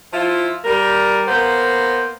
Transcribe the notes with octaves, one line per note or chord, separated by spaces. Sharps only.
F3 E4 F4
G3 A#4
A#3 B3 A#4 C5